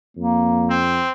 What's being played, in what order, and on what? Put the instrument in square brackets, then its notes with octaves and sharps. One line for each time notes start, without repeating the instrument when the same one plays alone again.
[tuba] F2 [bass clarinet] A#3
[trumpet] C4